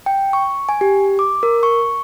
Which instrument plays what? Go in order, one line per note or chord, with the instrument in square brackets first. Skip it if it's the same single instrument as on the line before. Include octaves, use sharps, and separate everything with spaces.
[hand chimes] G5
C#6
G#5
G4
D6
A#4
C#6